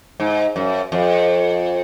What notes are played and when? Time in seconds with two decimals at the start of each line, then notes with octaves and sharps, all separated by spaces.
0.20 G#2
0.56 F#2
0.92 F2